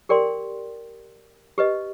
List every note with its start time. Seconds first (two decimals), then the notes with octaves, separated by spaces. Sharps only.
0.09 G4 A#4 D5 G5 C6
1.58 G4 B4 D#5